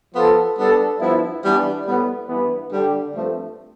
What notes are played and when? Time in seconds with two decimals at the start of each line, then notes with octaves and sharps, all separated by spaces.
0.14 F3 B3 F4 A4
0.57 G3 B3 D4 A4
1.00 G2 F3 B3 E4
1.43 E3 G3 B3 D4
1.86 A2 G3 B3
2.28 G2 E3 B3
2.71 D3 G3 D4 G4
3.14 G2 F3 A3 C4